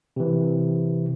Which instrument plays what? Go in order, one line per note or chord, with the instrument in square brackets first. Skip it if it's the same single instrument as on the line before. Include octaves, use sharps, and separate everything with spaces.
[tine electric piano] C3 E3